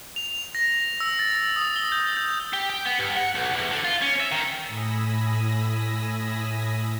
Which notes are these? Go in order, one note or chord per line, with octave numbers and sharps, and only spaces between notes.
F7
A#6
E6
A6
D#6
G7
G6
G6
G4
G5
B3
G2
F#5
B1
E2
D3
F4
C#4
E5
D#3
A2 G#5 B5 D#6 E6 A#6